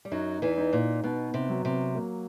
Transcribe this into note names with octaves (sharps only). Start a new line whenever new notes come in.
G3
F#2 F#3 D#4
E2 E3
D#4
A#2
B2 B3
C3
F#3
C3
A#3